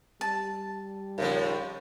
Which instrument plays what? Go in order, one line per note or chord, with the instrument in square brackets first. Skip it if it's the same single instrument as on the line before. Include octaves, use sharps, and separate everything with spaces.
[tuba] G3 [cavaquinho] A5
[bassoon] D#2 [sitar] A2 C#3 F3